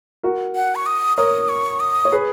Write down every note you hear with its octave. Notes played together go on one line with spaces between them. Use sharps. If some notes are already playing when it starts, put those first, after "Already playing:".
F#4 A#4
F#5
C#6
D#6
A#4 C#5 D#6
C#6
D#6
C#5
G#4 B4